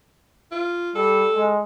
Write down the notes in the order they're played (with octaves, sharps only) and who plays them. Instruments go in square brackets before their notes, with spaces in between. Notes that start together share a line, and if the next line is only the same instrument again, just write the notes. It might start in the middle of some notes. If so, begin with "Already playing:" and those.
[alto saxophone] F4
[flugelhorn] G3 [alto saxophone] A4
[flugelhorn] G#3